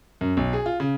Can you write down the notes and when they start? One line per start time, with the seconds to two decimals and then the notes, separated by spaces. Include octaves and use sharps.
0.21 F#2
0.37 B1
0.53 G#4
0.66 F4
0.80 C#3